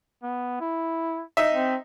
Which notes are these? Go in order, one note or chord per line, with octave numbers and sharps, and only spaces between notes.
B3
E4
D#4 E5
C4